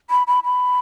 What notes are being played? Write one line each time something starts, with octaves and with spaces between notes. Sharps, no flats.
B5
B5
B5